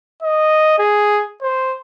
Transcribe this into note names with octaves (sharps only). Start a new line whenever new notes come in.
D#5
G#4
C5